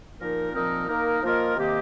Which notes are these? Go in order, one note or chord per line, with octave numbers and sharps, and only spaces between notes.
A#2 F3 D#4 A#4
A#2 F3 C4 D#4 A#4
A#3 D#4 A#4
F3 A#3 F4 A#4 D#5
C3 D#3 A#3 G4 D#5